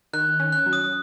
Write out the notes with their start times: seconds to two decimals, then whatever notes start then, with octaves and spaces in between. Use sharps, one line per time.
0.13 D#3 F#6
0.40 C#4
0.52 F#6
0.66 F#3
0.73 D#6